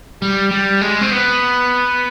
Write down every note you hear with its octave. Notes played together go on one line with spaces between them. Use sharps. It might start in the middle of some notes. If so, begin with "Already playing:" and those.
G3
G3
G#3
C4
B3